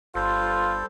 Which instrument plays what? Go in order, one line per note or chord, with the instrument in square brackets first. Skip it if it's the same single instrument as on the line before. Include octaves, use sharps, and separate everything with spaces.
[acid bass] G1 [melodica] G3 A4 C5 [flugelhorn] F4